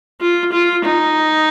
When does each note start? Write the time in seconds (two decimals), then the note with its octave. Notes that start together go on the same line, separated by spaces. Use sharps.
0.21 F4
0.53 F4
0.85 D#4